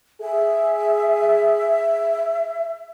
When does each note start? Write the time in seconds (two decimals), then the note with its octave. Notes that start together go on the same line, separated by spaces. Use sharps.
0.22 G#4 E5